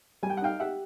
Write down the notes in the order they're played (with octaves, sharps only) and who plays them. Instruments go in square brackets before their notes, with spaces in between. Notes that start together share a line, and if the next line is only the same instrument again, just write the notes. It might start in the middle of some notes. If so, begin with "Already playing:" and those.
[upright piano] G3 [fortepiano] G#5
[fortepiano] G5
F#5
[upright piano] D#4 [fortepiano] F5 G5
[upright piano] G4 [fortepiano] E5 F#5